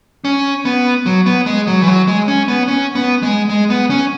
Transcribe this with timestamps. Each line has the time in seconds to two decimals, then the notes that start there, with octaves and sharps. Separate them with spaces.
0.25 C#4
0.65 B3
1.06 F#3
1.26 B3
1.46 G#3
1.67 F#3
1.82 E3
1.87 F#3
2.07 G#3
2.28 C#4
2.48 B3
2.68 C#4
2.95 B3
3.22 G#3
3.49 G#3
3.70 B3
3.90 C#4